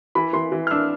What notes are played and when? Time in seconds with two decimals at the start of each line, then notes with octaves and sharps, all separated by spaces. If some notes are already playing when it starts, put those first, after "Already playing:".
0.15 E3 B5
0.33 E3 C6
0.52 E3
0.67 F6
0.71 D4 E6